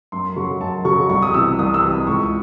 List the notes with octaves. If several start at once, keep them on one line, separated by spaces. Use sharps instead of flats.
F#2 C6
C#3 F#3 C#6
F#2 A5
C#3 F#3 C#6
C2 C#6
D#6
C3 E3 E6
C2 D#6
E6
C3 E3
D#6
C#2 C#6